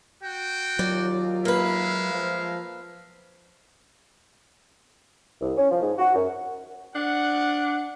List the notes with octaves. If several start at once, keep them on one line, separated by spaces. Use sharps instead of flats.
F#4 G5
D#2 F#3 F4 D5
G#3 A#3 B4 E5 F5
F3
C2
C#4
F3
G#2
F#4
F#2
D4 F#5